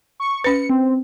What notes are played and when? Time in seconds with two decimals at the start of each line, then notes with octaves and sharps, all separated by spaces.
0.20 C#6
0.44 C#4 B4 C#7
0.70 C4